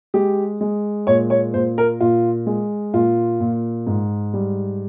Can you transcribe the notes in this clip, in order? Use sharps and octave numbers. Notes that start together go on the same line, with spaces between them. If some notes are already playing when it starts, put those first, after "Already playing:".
G#3 G4
G#3
A#2 C#5
C#5
A#2 C5
A#4
A#2 F4
G#3
A#2 F4
A#2
G#2
G3